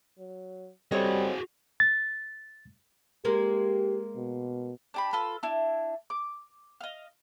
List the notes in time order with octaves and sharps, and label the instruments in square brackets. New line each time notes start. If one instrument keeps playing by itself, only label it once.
[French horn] F#3
[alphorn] G3 [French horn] C4 [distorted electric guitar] F#4 G#4 [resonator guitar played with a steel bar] A4 C#5 D#5
[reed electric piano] A6
[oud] G#3 A#3 A#4 [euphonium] G4
[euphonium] B2
[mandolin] D4 G4 B5
F4 A4 B4
D4 E4
D6
D#5 F5